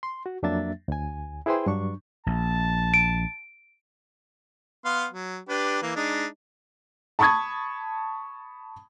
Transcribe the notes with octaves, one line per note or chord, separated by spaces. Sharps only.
C6
F#4
F2 F#3 A#3 D4 E5 A6
D2 G#5
E4 G#4 B4 C5 G5 C6
G2 F#3 D4 C#6
A#1 A5
D7
B3 F5 C6
F#3
D4 G4 B4
E3 A#3
G#3 D4 D#4
A5 B5 C#6 D#6 G#6